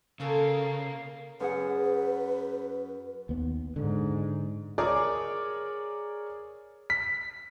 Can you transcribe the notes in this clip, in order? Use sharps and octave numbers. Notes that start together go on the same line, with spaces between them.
C#3 A#3 F4 A4 G#5
F#2 G#4 B4 F#5
D#2 B3
G#2 D3
G#4 A#4 C#5 D5 D6
B6